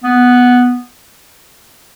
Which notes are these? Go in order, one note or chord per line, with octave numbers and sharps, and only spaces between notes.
B3